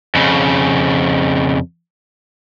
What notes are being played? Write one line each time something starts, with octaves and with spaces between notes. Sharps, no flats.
F2 C#3